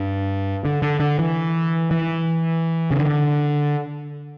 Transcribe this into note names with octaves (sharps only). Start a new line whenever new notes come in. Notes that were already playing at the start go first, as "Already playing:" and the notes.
Already playing: G2
D3
D3
D3
E3
E3
C#3
D3